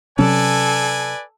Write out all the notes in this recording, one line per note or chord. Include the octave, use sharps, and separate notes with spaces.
C3 F#3 C#4 A4 B4 D5 G#5